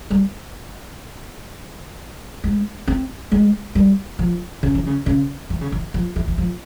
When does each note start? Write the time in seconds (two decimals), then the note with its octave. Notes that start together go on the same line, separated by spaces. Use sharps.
0.11 G3
2.44 G#3
2.87 C4
3.32 G#3
3.75 G3
4.19 F3
4.63 C#3
4.75 E3
4.86 C#3
5.06 C#3
5.50 E3
5.61 C#3
5.72 E3
5.94 F3
6.16 E3
6.27 E3
6.38 F3